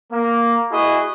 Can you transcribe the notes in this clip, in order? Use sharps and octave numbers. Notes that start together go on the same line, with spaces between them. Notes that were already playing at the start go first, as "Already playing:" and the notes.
A#3
E4 F#4 G#4 D#5